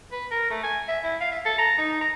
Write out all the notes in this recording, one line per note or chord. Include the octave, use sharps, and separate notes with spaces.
B4
A#4
A3
G#5
E5
E4
F5
E5
A4
A#5
D#4
A#5